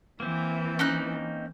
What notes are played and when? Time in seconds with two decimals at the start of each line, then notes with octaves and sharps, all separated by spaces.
0.20 E3 A#3 C4
0.79 C#4 D#4 F#6